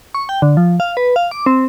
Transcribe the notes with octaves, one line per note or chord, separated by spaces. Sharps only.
C#6
G5
D3
F3
F5
B4
F5
D6
C4